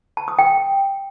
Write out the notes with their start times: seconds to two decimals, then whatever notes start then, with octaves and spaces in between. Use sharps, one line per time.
0.17 A5
0.28 D#6
0.39 G5